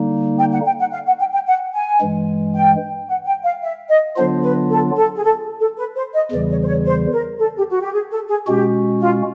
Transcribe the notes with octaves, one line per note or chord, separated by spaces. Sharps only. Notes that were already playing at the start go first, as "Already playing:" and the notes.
Already playing: D3 G3 A#3 D#4
G5
F#5
G5
F#5
F5
F#5
G5
G5
F#5
G#5
G2 E3 G#3
G5
F#5
G5
F5
E5
D#5
D3 F#3 B3 D4 F4 C5
B4
A4
A4
G#4
A4
A4
B4
C5
D#5
E2 C#3 E3 G3 D5
C#5
C5
C#5
C5
A#4
A4
G4
F#4
G4
G#4
A4
G#4
B2 G#3 C#4 F#4 G4
F4